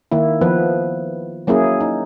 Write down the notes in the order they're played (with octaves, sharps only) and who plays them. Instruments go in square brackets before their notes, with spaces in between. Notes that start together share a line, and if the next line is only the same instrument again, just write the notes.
[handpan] D#3 A#3 E4
F3 B3 B4
F#3 A#3 C#4 E4 G#4
D#4